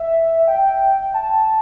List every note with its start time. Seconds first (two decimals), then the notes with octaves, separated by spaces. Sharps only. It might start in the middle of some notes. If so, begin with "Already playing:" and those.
Already playing: E5
0.48 G5
1.14 A5